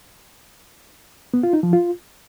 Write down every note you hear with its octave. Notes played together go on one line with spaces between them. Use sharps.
B3
F4
D#4
F3
F4